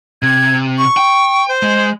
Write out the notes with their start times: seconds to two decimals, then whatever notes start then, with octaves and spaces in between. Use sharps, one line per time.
0.22 C3 G#6
0.78 C#6
0.97 G5
1.48 C5
1.63 G#3